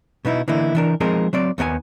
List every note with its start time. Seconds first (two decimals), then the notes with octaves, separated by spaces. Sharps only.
0.25 B2 B3 D#4 E4
0.48 D3 E3 A#3 D#4 E4
0.75 E3 D4 A#4
1.00 F3 G#3 C4 D#4 G#4 A#4
1.33 F#3 C4 D5
1.58 D#2 D#3 B3 D5 G#5